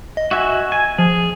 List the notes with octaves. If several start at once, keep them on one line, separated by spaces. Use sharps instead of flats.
D#5
F#4 E5 G#5
G#5
F3 G#4